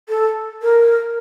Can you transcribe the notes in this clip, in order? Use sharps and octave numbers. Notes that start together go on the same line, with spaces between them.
A4
A#4